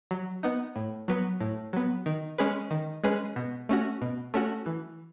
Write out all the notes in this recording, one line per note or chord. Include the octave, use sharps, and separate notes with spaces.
F#3
B3 D#4
A2
F#3 B3
A2
F#3 B3
D#3
G#3 C#4 G#4 B4
D#3
G#3 C#4 G#4 B4
B2
A3 C#4 F#4
B2
A3 C#4 F#4
E3